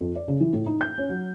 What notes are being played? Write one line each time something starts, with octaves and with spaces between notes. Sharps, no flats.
F2
D5
C#3
E3
A2
D#4
G6
C#4
F#3